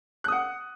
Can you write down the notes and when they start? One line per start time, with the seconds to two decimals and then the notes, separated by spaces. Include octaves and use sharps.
0.24 F#6
0.28 D#6
0.32 F#5